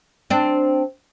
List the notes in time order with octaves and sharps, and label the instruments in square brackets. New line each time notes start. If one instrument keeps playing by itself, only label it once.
[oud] C4 D4